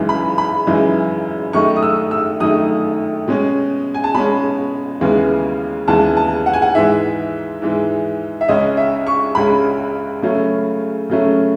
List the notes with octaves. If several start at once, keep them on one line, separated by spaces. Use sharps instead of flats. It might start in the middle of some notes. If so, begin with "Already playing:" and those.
Already playing: F#2 C#3 E3 G#3 D#4
B5
B5
F#2 C#3 E3 G#3 D#4
F#2 D#3 A3 D#4 C#6
D#6
E6
E6
F#2 D#3 A3 D#4 D#6
B2 G#3 C#4
G#5
A5
B2 G#3 C#4 B5
D#2 C#3 E3 G#3 B3
D#2 C#3 E3 G#3 B3 A5
A5
F#5
G#5
F#5
G#2 E3 G#3 E5
G#2 E3 G#3
E5
C#2 C#3 G#3 C#4 D#5
E5
C#6
C#2 C#3 G#3 C#4 B5
C#3 F#3 A3 C#4
C#3 F#3 A3 C#4